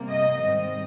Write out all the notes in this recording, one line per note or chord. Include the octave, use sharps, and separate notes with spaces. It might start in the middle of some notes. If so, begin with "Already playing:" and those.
Already playing: C3 G3 A#3
D#5
G#2 D#3 G3 C4 D#5